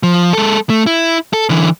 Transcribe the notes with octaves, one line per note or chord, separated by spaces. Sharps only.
F3
G#3 A4
A3
E4
A4
D3 E3